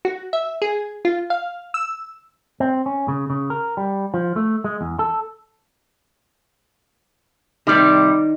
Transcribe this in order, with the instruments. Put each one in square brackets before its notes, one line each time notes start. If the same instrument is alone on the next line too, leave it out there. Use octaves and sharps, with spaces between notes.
[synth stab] F#4
E5
G#4
F4
F5
E6
[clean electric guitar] C4
C#4
C#3
C#3
A#4
G3
F3
A3
G#3
E2
A4
[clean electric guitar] C3 G3 [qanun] D#3 D5